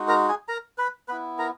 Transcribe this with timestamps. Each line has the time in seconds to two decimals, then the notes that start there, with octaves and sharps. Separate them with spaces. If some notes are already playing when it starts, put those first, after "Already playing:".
Already playing: G#3 D#4 F#4
0.08 A#4 A#5
0.29 G#4 G#5
0.48 A#4 A#5
0.78 B4 B5
1.08 B3 E4 B4 B5
1.38 A#4 A#5